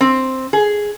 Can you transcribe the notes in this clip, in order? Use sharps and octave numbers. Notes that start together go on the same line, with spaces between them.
C4
G#4